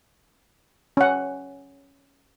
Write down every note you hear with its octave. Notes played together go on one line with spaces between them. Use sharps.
C#4 F#5